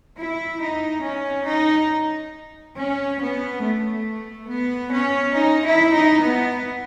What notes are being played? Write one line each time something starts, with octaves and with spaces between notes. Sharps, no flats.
E4
D#4
C#4
D#4
C#4
B3
A3
B3
C#4
D#4
E4
D#4
B3